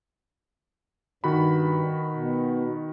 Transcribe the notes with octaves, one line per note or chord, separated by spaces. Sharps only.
G2 D#3 F#4 B5
B2